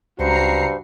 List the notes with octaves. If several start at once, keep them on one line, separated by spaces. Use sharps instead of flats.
C#2 G2 F#4 C5 A#5 C7 C#7